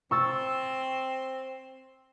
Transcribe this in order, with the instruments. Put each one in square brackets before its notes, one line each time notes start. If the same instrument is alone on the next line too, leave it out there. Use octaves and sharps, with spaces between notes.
[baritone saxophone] C4 [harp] C#6 E6 A6